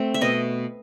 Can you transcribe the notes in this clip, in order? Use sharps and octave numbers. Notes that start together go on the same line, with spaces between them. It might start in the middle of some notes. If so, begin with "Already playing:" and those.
Already playing: A3 C4
E5
B2 D#5